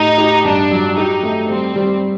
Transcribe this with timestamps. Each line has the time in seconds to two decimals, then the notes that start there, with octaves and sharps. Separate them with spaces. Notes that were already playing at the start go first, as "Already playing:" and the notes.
Already playing: A2 D#4 G4
0.18 G4
0.45 G2 D4
0.71 F#3
0.97 D#4 G4
1.23 A3
1.50 G3 C4
1.76 G3